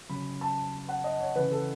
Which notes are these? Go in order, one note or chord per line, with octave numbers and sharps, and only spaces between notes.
C#3 F#3 B5
A5
F#5
D#5
C#5
C#3 E3 B4
A4